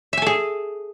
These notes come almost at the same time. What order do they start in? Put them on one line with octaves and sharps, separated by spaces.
E5 G#5 A4 G#4